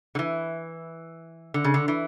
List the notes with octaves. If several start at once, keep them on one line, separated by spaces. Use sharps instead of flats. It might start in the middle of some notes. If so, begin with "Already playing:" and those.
D3
E3
D3
C#3
D3
E3